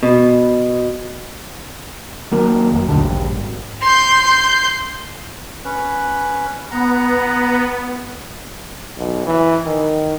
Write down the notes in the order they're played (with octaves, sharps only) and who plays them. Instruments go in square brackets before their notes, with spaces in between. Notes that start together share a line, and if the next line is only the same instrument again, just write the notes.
[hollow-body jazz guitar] B2
[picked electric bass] D#3 F#3 A#3
G1 F#2
A1 D#2 B2 D3
A#1 G2
G#1
[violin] C6 G6
[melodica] C#4 B4
[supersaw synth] B3 [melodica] F#5 A#5
[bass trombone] B1
E3
D#3